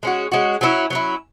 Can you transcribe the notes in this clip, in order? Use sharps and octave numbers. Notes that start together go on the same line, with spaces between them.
G#3 C#4 F#4
G#3 C#4 F#4
F#3 C#4 E4
F#3 C#4 E4